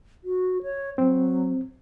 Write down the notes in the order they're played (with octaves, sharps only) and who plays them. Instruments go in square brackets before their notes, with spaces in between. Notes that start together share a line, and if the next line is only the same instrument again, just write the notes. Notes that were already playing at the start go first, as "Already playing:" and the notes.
[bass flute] F#4
C#5
[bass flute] F#3 [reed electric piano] C4